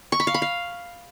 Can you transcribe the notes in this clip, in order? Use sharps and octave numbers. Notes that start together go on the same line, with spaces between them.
C#6
B5
F5
B5
F5